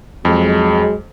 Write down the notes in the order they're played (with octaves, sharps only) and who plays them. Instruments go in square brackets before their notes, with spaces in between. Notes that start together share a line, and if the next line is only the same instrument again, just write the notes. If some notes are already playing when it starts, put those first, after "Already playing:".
[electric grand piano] F2 [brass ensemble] F#3 G#3